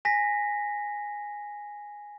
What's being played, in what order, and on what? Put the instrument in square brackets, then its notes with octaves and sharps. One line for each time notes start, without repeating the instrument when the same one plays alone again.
[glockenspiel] G#5 A#6 B6